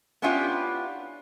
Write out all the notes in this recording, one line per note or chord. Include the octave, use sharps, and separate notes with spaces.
B3 C#4 D4 E4 F4 G4